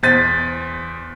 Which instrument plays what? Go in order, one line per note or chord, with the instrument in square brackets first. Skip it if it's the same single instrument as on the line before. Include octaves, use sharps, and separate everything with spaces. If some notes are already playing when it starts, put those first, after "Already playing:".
[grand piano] E2 C5 A6 B6 D#7